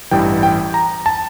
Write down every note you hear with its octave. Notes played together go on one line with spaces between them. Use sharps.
A1 G2 E3 G3 G5
G5
A#5
A5